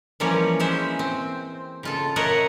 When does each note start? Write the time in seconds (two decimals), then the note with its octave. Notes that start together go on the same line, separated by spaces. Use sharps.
0.20 E3 F3 G3 A#3 C#4 C#5
0.60 G#3 C#4 C5 E5
0.99 C4
1.83 C#3 F4 A4
2.16 A#4 C#5 D#5 E5 F#5